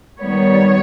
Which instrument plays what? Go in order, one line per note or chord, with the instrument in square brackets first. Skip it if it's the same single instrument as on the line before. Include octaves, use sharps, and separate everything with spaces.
[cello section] D#3 G3 B3 C#5